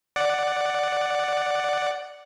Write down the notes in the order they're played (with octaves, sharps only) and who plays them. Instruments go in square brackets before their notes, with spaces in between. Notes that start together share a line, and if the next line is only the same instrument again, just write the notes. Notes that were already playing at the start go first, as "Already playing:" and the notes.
[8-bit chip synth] D5 F#5